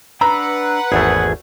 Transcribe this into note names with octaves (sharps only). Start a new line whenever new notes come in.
D4 B4 F#5 A#5 B5 E6
G#1 E2 A3 G#4